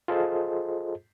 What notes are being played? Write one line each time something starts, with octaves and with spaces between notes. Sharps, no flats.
F4 G#4 A4 C5 D#5